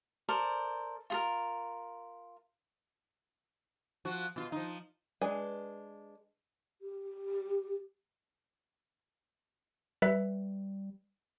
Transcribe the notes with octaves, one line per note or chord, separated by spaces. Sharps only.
A4 A#4 C5 D5
F4 G#4 A#4
F3 F#4
B2 F4
F3 D#4
G#3 D4 B4 G#5
G4
G3 B4 E5